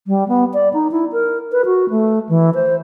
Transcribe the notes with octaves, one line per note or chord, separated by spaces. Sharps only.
G3
B3
D5
D#4
E4
A#4
B4
F#4
A3
E3
C5